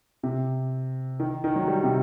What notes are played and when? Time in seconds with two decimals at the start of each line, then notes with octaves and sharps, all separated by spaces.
0.23 C3
1.20 D#3
1.44 D#3
1.56 F#3
1.68 G3
1.84 C3